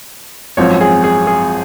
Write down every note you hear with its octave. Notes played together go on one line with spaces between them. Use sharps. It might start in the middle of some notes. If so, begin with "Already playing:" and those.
G#1 F#2 F3 C4 C#5
G#4
G#4
G#4